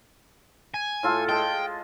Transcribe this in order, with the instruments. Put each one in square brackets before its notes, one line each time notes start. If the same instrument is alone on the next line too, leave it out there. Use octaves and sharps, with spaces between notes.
[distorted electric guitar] G#5
[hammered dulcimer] A2 F4 A4
[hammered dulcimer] G#3 A5 [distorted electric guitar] G5